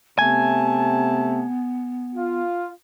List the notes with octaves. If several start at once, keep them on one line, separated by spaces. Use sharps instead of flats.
C3 A3 B3 G#5 A5
F4